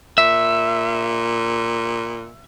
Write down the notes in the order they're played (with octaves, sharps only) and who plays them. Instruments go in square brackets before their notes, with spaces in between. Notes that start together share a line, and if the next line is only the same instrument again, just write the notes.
[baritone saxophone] A#2 [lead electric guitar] E5